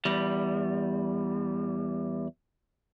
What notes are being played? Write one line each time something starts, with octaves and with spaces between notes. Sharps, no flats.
E2 G3